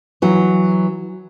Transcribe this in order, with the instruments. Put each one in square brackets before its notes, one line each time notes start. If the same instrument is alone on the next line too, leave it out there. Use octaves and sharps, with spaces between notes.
[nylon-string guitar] E3 F#3